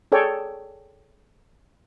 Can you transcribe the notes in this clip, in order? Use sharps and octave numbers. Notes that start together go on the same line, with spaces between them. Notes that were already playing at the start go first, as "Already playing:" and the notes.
G#4 A4 C#5 D5 G5